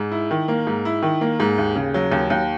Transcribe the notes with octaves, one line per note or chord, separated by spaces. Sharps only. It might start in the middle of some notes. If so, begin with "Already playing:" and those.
Already playing: G#2
E4
D#3
A#3
G#2
E4
D#3
A#3
G#2
D#2
C#3
F#3
D#2
D#2